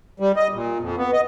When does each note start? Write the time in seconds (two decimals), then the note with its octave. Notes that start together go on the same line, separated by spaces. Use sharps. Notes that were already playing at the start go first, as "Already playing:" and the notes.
0.20 G3
0.36 D#5
0.54 A#2
0.81 F2
0.97 B3
1.13 D#5